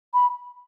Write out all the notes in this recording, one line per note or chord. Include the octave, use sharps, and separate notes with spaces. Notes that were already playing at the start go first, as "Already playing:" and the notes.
B5